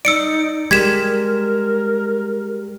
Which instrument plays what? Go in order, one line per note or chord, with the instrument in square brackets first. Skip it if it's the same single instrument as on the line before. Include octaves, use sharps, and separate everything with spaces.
[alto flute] D#4 [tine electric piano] D5 [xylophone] E6 C#7 D7
[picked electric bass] G3 G#3 [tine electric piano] G4 [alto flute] A#4 [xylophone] G#6 B6 E7